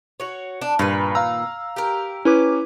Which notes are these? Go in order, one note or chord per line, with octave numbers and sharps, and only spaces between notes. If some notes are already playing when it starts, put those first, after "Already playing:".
F#4 C#5
D4
G2 A#2 D#3 B4
F5 A#5 E6
G4 A#4
C#4 E4 B4 D6